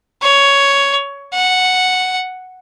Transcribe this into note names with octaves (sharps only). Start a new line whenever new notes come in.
C#5
F#5